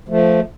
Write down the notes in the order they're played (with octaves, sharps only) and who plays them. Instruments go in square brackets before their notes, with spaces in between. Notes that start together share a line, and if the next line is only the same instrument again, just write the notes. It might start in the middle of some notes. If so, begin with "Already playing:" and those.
[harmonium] F3 A3